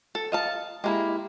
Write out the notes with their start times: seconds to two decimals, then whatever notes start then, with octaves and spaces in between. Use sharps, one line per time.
0.15 A4
0.32 D#5 F5 A5
0.84 G#3 A#3 E4 G4